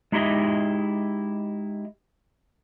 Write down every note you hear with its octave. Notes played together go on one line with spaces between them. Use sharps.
G#3 D#4 E4 G4 D#5 E5